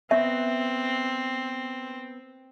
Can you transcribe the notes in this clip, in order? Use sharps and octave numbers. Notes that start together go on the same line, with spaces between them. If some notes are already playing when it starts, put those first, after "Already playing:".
B3 C4 E5